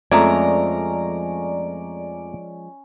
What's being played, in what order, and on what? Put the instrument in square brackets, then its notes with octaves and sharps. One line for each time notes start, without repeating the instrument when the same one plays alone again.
[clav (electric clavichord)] F2 A3 G#5 [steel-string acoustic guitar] F3 G#3 [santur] C#4 A#5 [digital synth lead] D5